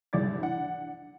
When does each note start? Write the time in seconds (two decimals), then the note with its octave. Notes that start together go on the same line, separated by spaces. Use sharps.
0.13 F#1 C2 G#2 D5 D6 A6
0.40 E3 D4 F#5